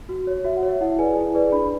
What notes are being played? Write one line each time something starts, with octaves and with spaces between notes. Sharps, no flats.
F#4
C#5
F#4 E5
F#5
C#5
E5
E4 F#5
G#4 B4 D5 G#5
E4
G#4 B4 D5
D4 B5